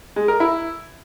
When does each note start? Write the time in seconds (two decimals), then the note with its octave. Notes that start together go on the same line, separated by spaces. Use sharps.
0.16 G#3
0.28 A#4
0.40 E4